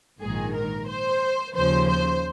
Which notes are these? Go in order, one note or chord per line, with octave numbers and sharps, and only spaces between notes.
A#1 G#2 D#3 G#4
A#4
C5
D#2 C#3 F3 C5
C5